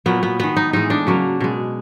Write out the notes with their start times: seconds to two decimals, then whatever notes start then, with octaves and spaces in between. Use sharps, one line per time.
0.06 A#2 F#3 A#3 B3
0.23 B3
0.39 D#3 G#3 B3
0.56 D#4
0.73 A2 E3 G#3 D#4
0.90 D4
1.07 C#3 F#3 A#3
1.40 B2 G#3